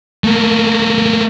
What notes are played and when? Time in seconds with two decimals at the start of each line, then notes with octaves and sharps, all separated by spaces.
0.24 A3 A#3